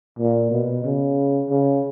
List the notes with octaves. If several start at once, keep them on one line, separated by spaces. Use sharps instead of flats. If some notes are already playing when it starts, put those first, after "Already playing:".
A#2
B2
C#3
C#3